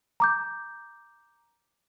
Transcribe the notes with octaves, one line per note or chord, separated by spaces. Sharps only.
A#5 D6 G6